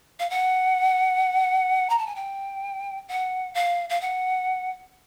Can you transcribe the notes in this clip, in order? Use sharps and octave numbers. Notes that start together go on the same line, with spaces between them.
F5
F#5
A#5
A5
G#5
G5
F#5
F5
F5
F#5